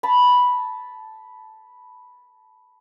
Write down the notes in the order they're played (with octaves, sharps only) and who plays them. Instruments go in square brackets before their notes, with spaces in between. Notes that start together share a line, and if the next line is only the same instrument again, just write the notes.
[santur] A5 B5